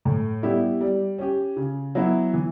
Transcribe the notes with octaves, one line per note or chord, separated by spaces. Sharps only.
A2
G3 B3 E4 G4
G3
C#4 G4
C#3
F#3 B3 E4
E3